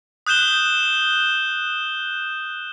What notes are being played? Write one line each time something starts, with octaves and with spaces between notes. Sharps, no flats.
D#6 F#6 G6 E7 G7